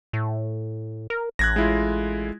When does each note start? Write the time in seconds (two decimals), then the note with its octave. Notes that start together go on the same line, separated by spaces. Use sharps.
0.13 A2
1.10 A#4
1.39 A1 F#6 G#6 A#6
1.56 G#3 E4 F4